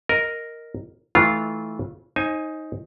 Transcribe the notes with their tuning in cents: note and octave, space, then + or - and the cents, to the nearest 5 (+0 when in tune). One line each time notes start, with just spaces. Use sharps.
A#4 +0 D#5 +0
E3 -30 A3 -20 F4 -15
D#4 +10 C5 +35 G#5 +0